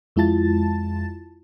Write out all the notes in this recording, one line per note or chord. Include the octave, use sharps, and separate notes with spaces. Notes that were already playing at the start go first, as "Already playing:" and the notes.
F2 G#3 E4 F4 A5 A6